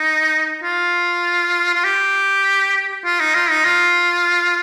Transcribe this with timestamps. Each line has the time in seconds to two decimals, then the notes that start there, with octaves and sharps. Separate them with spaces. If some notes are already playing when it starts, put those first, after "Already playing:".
Already playing: D#4
0.64 F4
1.74 F4
1.84 G4
3.05 F4
3.20 D#4
3.35 F4
3.50 D#4
3.65 F4